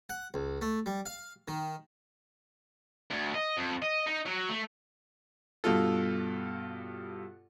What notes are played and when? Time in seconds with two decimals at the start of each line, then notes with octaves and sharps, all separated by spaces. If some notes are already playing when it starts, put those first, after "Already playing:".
0.09 F#5
0.34 C#2
0.61 A3
0.86 G3
1.06 F5
1.48 D#3
3.11 D2
3.34 D#5
3.57 F2
3.82 D#5
4.07 D#4
4.26 F#3
4.49 A3
5.64 G2 B2 F4 A4